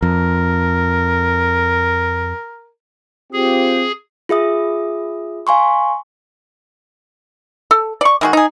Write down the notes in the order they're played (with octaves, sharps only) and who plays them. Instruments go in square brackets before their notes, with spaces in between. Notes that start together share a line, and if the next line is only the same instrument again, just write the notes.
[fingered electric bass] F2 [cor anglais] A#4
[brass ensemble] C4 F4 G4 [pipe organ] G#4
[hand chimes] F4 G#4 E5 D#6
F5 G#5 C6 C#6
[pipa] A4
D5 C#6
D#3 G#3 F#4
D#4 G#4